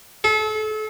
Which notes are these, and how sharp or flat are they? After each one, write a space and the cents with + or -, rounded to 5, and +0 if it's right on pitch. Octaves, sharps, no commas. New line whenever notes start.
A4 -35